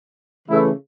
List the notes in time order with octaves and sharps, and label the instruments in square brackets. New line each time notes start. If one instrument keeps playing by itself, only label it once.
[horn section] C#3 E3 A3 E4